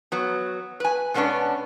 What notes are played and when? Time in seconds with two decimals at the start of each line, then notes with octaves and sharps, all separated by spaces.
0.12 F#3 B3
0.80 B4 G#5
1.14 B2 G#3 B3 C#4 D4